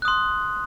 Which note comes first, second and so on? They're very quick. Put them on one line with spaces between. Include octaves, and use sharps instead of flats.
F#6 D#6 C6